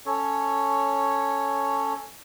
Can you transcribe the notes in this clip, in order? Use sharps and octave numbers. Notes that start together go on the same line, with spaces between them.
C#4 A4 C#5